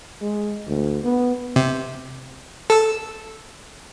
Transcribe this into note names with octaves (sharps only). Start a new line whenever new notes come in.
G#3
D2
B3
C3
A4 E6